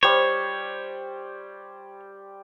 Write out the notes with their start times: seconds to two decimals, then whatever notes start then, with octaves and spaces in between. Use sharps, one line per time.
0.03 G3 C5 C#5